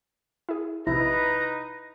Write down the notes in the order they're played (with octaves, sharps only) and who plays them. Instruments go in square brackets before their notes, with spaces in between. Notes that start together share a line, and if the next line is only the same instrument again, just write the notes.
[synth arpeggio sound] E4 G#4
[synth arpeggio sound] A#1 C3 [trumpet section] D#4 B4 [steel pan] E4 [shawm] A#5